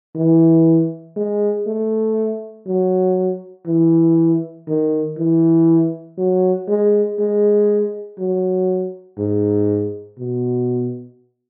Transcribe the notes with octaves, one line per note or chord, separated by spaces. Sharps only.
E3
G#3
A3
F#3
E3
D#3
E3
F#3
G#3
G#3
F#3
G#2
B2